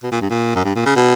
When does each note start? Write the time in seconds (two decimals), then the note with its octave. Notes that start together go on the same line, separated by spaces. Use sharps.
0.03 B2
0.12 A#2
0.21 G2
0.30 A#2
0.56 F#2
0.65 G2
0.75 A#2
0.86 C#3
0.96 B2